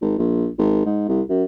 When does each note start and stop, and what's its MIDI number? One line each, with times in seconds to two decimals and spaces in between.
0.01 0.14 32
0.18 0.48 34
0.58 0.84 32
0.85 1.07 44
1.08 1.22 36
1.29 1.44 42